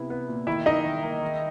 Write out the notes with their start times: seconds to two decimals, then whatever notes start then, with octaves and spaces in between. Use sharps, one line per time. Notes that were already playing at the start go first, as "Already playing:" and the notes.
Already playing: C3 B3 E4
0.10 B3
0.29 A#2
0.47 D#3 E4 E5
0.66 A#3 D#4 D#5
0.85 D#3
1.03 A#3
1.22 D#3